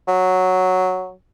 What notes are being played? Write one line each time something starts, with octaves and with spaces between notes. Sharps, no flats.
F#3